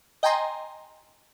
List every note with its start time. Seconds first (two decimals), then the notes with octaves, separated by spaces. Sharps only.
0.23 D#5 G5 G#5 A#5 C6